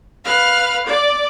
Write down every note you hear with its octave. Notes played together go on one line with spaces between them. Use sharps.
B4 F5 F6
D5